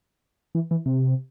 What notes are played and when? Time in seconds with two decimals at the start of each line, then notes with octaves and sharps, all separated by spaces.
0.55 E3
0.71 E3
0.86 C3